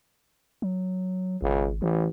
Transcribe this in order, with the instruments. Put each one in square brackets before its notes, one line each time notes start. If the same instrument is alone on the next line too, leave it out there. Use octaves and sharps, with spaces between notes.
[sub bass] F#3
[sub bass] G#1 [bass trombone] C#2
[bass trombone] A1 [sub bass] E3